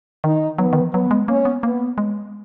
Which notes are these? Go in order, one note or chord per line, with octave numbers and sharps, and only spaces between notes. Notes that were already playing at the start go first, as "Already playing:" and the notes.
D#3 D#4
F#3 B3
F3
D#3
F3
F#3 B3
G#3
A#3 C#4
B3
A#3 B3
G#3